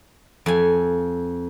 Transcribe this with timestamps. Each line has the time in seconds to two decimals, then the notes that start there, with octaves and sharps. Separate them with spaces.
0.46 F2 G#5